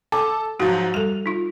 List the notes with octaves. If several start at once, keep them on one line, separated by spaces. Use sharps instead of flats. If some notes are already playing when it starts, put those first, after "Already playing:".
A4 D6
G#2 F3 F#3 F#4
G3 A4 F7
D#4 F4